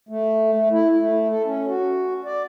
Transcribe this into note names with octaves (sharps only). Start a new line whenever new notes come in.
A3
A3
E4
A3
A4
C#4
F#4
D5